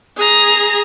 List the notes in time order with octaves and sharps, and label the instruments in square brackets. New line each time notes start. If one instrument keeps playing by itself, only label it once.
[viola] G#4 A#5